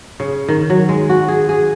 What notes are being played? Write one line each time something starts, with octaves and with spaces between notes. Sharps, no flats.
C#3
D#3
F#3
G#3
F#4
G#4
G#4